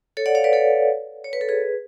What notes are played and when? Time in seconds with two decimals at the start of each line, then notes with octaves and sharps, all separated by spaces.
0.17 A4 C#5
0.26 D5 F#5
0.35 C#5 F5
0.44 B4 D5
0.53 A4 C#5
1.24 C#5
1.33 B4
1.41 A4
1.49 G#4 B4